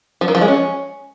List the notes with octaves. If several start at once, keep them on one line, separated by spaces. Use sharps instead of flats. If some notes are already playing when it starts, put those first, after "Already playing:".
F3
D#3
F3
G#3
C#4